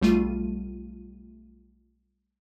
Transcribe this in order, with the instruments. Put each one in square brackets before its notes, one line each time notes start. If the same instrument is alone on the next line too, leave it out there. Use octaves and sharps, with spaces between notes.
[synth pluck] B1 G3 A3 F4 D#7